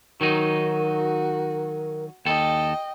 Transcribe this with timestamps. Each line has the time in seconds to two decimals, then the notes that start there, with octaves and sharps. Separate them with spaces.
0.21 D#3 F#3 D#4 F#4 A#4
2.26 D#2 A4 D#5 G5